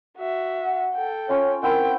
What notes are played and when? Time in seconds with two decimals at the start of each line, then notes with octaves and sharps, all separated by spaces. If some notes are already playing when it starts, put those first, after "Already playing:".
0.18 F#4 E5
0.65 F#5
0.95 A4 G5
1.29 C#4 F4 C#5 F5
1.63 C4 E4 A#4 F#5 G5